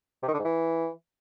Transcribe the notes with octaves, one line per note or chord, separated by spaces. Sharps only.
C3
D#3
D3
G#2
E3